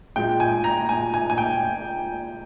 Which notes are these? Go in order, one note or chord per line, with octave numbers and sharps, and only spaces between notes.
A#2 G#3 G5
G#5
A#5
G#5
G#5
G#5
G5